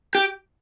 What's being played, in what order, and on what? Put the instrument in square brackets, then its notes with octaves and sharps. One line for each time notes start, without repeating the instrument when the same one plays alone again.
[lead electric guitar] G4